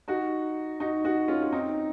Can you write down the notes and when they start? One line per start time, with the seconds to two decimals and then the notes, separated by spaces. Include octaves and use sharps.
0.08 D#4 F#4
0.80 D#4 F#4
1.04 D#4 F#4
1.28 C#4 F4
1.42 F4
1.52 C4 D#4